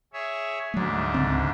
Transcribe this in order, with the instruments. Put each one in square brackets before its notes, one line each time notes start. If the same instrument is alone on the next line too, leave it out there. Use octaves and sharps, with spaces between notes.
[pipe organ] G#4 C#5 E5
[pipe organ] D2 G#2 D4 [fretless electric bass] F#3 A3
[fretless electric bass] C#2 C#3 C4